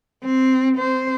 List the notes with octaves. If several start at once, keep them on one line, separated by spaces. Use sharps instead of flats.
C4
C4 C5